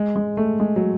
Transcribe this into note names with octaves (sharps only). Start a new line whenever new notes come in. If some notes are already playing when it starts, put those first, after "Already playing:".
Already playing: G#3
G#3
A3
G#3
F#3